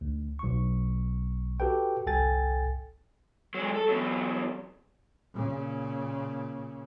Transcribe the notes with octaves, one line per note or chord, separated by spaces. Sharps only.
D2
B1 C#6
F#4 G4 A4 B4 G5
G1 C2 A4 G5 G#5 A6
F#3 G#3
A4
E2 F#3
A#2 C#3